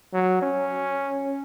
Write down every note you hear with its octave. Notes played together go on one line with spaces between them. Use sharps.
F#3
C#4